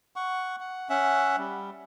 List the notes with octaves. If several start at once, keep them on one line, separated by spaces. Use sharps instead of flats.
F#5 C#6
F#5
C#4 E5 F#5
G3